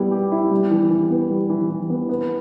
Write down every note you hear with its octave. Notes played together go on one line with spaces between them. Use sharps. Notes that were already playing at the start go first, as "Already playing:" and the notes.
Already playing: G3 B3 E4
G4
E4
G3
E3
E3
B3
G3
E3
E3
B3
B3